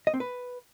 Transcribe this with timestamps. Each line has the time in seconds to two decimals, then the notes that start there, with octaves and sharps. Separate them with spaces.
0.07 D#5
0.14 C4
0.20 B4